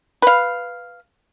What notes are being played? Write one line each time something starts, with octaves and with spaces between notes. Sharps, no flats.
B4 F5